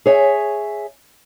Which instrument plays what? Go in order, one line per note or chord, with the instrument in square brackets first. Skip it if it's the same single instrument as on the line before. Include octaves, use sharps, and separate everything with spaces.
[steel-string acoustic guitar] G#4 C#5 E5 G#5